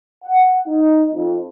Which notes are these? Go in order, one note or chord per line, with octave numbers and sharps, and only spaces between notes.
F#5
D#4
F2